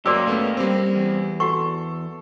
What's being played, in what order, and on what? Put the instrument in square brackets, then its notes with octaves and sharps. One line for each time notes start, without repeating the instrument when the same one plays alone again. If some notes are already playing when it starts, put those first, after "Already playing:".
[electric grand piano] F#2 D6 [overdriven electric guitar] A#3 G4 [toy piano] F#4 D5 E6
[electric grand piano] A3 B3 C#4
G3 C4
[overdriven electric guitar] E2
[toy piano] F#4 F#5 C#6 [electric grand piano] A4